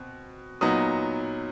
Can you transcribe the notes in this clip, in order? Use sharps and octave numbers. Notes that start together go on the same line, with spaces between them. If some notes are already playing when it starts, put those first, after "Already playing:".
Already playing: B2 C4
A#2 F#3 B3 D#4 D#6